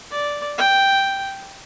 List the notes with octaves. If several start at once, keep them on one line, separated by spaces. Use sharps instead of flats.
D5
G5